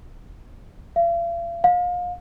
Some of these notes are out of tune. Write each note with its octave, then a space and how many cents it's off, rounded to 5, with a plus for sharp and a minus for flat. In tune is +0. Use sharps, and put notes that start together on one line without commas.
F5 -45
F5 +30